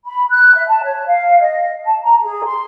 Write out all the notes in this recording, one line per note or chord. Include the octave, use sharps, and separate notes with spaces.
B5
F#6
E5
A5
C#5
F5
D#5
A5
A#5
G#4
C6